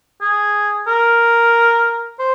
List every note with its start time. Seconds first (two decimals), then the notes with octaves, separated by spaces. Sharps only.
0.21 G#4
0.87 A#4
2.19 C5